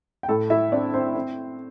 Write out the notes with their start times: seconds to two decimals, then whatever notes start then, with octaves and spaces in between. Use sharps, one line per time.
0.23 G5
0.29 A2 A4 A5
0.50 E4 E5
0.72 C4 D4 D5
0.94 C4 C5
1.15 C4